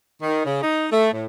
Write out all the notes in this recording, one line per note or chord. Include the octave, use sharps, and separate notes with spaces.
D#3
C#3
D#4
A3
A2